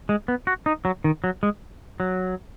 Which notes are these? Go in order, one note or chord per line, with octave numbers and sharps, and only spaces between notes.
G#3
B3
F#4
D#4
F#3
D#3
F#3
G#3
F#3